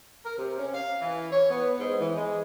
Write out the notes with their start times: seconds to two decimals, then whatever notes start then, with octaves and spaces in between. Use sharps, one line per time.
0.24 A#4
0.37 C3
0.58 C#4
0.74 F5
1.01 E3
1.31 C#5
1.50 B3
1.79 G#2
2.00 E3
2.17 G#3